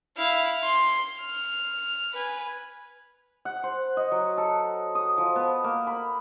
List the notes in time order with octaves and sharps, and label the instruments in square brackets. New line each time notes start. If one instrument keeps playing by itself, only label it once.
[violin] E4 F5
C6
F6
B4 G#5
[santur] F#5
C5
D#5
F#3
A4
D#6
F3
B3
A#3
B5